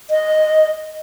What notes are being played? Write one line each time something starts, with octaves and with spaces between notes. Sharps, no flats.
D#5